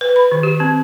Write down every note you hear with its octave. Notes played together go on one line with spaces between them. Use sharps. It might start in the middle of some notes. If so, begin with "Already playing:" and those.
B4
B5
D#3
G4
C4